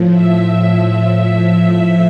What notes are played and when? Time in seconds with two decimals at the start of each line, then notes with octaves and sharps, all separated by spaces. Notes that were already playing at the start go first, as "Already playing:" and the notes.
Already playing: A2 F3
0.12 E5
0.42 E5